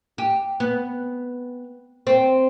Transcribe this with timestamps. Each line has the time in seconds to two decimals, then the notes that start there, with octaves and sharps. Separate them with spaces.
0.18 G4
0.60 B3
2.07 C4